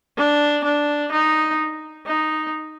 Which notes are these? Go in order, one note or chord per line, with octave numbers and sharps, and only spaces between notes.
D4
D4
D#4
D#4